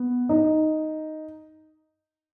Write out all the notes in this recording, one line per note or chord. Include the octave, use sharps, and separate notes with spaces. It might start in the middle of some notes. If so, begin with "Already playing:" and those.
Already playing: B3
D#4